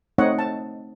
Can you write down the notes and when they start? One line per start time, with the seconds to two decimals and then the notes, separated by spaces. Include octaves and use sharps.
0.18 A3 C4 D#4 C#5 D#5 F#5
0.39 A5